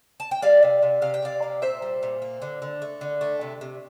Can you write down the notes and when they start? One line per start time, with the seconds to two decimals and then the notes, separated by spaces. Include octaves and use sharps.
0.20 A5
0.31 G5
0.42 G3 D5 F5
0.62 C3
0.82 C3
1.02 C3 F5
1.14 G5
1.22 C3 D5 F5
1.42 A#3
1.62 A#2 C5 E5
1.82 G3
2.03 A#2
2.22 A#3
2.42 D3
2.62 D3
2.82 A3
3.01 D3
3.21 A3
3.41 C3
3.61 C3